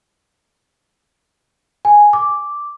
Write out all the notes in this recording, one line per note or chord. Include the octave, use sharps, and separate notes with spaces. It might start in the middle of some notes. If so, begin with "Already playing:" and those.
G#5
D6